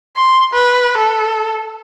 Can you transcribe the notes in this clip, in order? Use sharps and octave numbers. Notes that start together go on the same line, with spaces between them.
C6
B4
A4